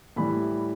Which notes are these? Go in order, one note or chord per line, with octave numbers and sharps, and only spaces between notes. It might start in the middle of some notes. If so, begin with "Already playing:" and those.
A2 E3 G3 B5